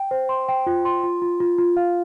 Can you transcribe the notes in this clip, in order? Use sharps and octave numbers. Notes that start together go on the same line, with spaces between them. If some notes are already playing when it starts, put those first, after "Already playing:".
Already playing: G5
C5
C6
G5
F4
C6
F4
F4
F4
F4
F5